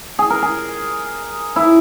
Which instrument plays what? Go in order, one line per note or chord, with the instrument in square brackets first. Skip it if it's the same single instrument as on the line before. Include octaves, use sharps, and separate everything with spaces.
[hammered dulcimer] G#4
A#4
G#4
E4